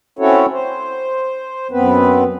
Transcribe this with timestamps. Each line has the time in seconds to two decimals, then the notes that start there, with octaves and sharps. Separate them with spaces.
0.19 C4 C#4 E4 F#4 A4 C#5
0.52 C5
1.71 F#2 B3 C4 B4